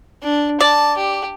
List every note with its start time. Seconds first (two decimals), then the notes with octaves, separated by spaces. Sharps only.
0.22 D4
0.61 D5 A5
0.97 G4